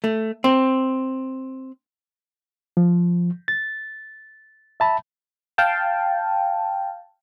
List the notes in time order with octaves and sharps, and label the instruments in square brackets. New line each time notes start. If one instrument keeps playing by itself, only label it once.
[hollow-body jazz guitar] A3
C4
[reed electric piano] F3
A6
E5 A5 B5
[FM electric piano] F5 G5 A5